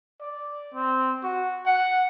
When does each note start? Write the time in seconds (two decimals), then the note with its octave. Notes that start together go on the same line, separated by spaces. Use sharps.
0.21 D5
0.74 C4
1.23 F#4
1.66 F#5